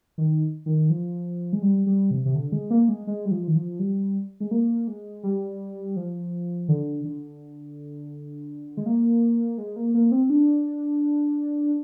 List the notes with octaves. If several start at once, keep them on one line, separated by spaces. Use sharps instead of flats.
D#3
D#3
F3
G#3
G3
G3
C3
C3
D3
G#3
A#3
G#3
G#3
G3
F3
D#3
F3
G3
G#3
A#3
G#3
G3
F3
D3
D3
G#3
A#3
G#3
A#3
A#3
C4
D4